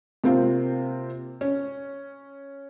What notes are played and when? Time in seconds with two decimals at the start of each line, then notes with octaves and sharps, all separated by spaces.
0.24 C3 A#3 C4 F4
1.41 C#4